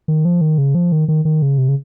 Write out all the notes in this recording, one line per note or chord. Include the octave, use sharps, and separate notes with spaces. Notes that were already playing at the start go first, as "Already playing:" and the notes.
D#3
F3
D#3
C#3
F3
D#3
D#3
D#3
C#3
C3
C#3